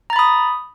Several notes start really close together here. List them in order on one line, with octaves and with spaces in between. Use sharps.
A#5 A6 B5 D#6